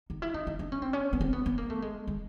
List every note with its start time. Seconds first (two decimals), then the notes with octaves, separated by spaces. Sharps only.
0.10 D#4
0.22 E4
0.34 D#4
0.47 D#4
0.59 D4
0.72 C#4
0.82 C4
0.93 C#4
1.13 B3
1.21 C4
1.33 B3
1.46 B3
1.58 A#3
1.70 A3
1.82 G#3
2.07 G#3